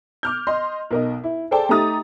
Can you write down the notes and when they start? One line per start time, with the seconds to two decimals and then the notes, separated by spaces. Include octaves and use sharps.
0.23 D6 F6 G6
0.47 D#5 C6
0.91 B1 A#4 D#5
1.23 E4
1.51 G#4 A4 C5 D5 G5 A5
1.69 A3 D#4 G4 A#5 D#6 A6